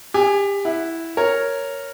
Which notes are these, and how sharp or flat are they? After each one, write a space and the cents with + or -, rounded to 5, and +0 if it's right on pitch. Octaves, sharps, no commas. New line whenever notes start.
G4 +30 G#5 +0
E4 +0 F#5 +0
A#4 +0 C#5 +0